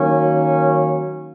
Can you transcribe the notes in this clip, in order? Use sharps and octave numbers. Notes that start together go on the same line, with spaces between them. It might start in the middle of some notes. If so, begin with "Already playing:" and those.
Already playing: D#3 F#3 A#3 C#4